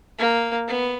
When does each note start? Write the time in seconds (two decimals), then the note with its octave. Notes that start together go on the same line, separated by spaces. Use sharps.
0.19 A#3
0.68 B3